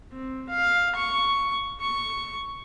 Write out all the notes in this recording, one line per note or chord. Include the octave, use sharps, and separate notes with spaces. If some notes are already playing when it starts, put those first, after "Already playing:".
C4
F5
C#6
C#6